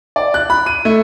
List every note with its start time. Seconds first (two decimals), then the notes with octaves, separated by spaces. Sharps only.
0.16 D5
0.34 F#6
0.50 B5
0.66 D#7
0.85 A3